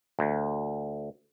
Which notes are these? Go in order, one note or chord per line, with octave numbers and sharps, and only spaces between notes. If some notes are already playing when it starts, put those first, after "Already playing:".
D2